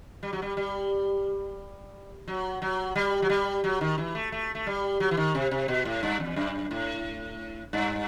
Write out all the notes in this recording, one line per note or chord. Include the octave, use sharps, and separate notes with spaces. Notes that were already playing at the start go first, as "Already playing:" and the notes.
G3
F#3
G3
G3
F#3
F#3
G3
F#3
G3
F#3
D#3
E3
A3
A3
A3
G3
F#3
E3
D#3
C3
C3
B2
A2
G2
E2
F#2
A2
G2